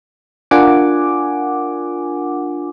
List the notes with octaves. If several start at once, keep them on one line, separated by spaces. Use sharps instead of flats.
D4 F4 A#4 F#5 G#5 D6